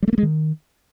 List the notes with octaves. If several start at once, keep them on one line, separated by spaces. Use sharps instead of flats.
G3
A3
A#3
G#3
D#3